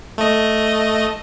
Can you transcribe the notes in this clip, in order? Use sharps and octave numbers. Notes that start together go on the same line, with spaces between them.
A3 D#5